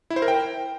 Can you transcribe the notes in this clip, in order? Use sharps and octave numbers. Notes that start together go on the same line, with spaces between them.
E4
C5
A#4
G5